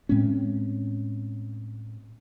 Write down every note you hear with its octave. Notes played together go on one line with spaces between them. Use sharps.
A2 G#3 C4 C#4